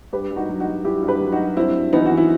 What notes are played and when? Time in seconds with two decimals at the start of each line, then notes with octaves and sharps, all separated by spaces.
0.13 G2 G4 B4
0.31 G2
0.36 D#4 F#4
0.49 F#3
0.60 D#4 F#4
0.67 F#3
0.84 G2 E4 G4
1.03 G2
1.08 G4 B4
1.21 F#3
1.32 D#4 F#4
1.38 F#3
1.57 G2 C4 E4
1.75 G2
1.93 E3 B3 D#4
2.06 F#4
2.11 E3
2.17 E4